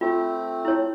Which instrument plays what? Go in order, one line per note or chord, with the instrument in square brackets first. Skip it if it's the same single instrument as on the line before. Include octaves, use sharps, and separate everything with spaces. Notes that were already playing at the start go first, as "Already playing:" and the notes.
[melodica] A3 C4 [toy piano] F4
[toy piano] E4 C#5